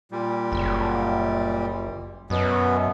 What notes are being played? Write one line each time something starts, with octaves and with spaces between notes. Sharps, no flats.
A#2 G3
F#1
F#2 B2 B3